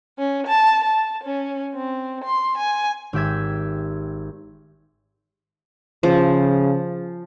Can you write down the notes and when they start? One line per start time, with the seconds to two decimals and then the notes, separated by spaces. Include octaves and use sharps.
0.18 C#4
0.47 A5
0.84 A5
1.24 C#4
1.73 C4
2.24 C6
2.58 G#5
3.13 G#1 G4 E5 G#6
6.03 C#3 F3